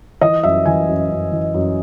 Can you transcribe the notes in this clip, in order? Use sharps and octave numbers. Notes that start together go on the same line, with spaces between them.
E3 D#5
F#2 E5
E3 G#5
F#2
F#2
E3
F#2